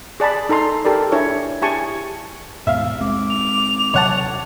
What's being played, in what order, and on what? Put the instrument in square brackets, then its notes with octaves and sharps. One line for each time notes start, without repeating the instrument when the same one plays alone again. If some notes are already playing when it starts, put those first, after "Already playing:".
[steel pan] G#4 D5 A5 B5
D#4 A4 A#5 C6
G4 A4 A#4 D5
D4 E4 G#4 C#5
E4 G4 G#4 G#5 A5 C#6
[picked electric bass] D#2 G#2 B2 [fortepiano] E5 F5
[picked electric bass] G#3 C4 [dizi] D6
[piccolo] F7
[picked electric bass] D#1 C3 F#3 [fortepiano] C#5 F#5 A5